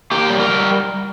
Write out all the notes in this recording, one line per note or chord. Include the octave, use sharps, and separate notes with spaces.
A#3 G4
G3
A#4
G3